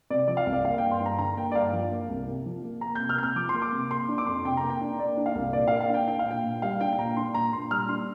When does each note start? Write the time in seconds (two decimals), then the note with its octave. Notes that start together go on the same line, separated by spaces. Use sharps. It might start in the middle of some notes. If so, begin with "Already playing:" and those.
0.10 C3 D5
0.28 F3 D5
0.37 F5
0.47 C2
0.53 D5
0.64 A#3 F5
0.78 G2 G5
0.91 C6
1.00 G2
1.06 A#5
1.18 D3 A#5
1.37 A#3 G5
1.52 D5
1.55 G2 F5
1.73 F3
1.91 A#3
2.09 C2
2.27 C3
2.46 F3
2.64 A#3
2.81 A#3 A#5
2.95 C3 G6
3.09 F6
3.18 C3 G6
3.23 F6
3.36 F3 D6
3.49 C6
3.54 A#3
3.62 D6
3.72 C3
3.91 A#3 C6
4.08 D4
4.18 D6
4.26 F2 C6
4.45 C3 G5
4.57 A#5
4.63 A#3
4.70 G5
4.81 D4
4.99 A#3 D5
5.17 D4
5.26 F5
5.35 C2
5.53 A#2 D5
5.68 A#3 F5
5.81 F5
5.89 D4 G5
6.08 D4 G5
6.19 F5
6.26 A#2 G5
6.44 A#2
6.62 G3 F5
6.80 D4 G5
6.93 G5
6.98 A#2 A#5
7.17 D4 C6
7.34 A#2 A#5
7.52 A#2 C6
7.71 G3 F6
7.89 D4 C6